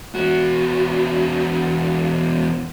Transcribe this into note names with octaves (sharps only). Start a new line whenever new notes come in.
E2 F#4